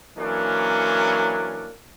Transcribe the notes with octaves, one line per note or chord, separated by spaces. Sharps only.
E3 F#3 A#3 C#4 D4